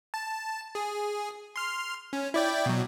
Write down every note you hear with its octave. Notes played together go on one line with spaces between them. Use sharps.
A5
G#4
C6 F6
C#4
E4 D5 G5
B2 F#3